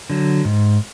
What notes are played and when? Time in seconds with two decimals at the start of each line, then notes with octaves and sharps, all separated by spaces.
0.10 D3 F#3
0.45 G#2